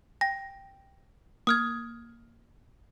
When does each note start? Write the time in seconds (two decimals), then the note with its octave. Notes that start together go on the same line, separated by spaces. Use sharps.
0.21 G5 A#6
1.47 A#3 D#6 F6 G#6